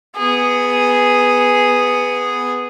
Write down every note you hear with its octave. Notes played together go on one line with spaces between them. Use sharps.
B3 G#4